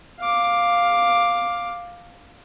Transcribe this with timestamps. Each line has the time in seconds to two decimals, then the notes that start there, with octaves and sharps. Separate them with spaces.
0.20 F5 D6